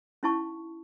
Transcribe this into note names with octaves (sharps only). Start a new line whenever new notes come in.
C#4 D#4 E4 F5 A5 C#6